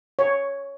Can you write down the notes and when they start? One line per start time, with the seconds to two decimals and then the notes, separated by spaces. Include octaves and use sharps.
0.19 C#5